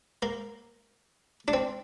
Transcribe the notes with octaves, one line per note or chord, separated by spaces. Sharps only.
A#3
D4
C4